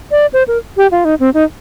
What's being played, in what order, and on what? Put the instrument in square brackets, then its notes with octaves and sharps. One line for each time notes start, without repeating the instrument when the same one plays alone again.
[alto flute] D5
C5
A#4
G4
F4
D#4
C4
D#4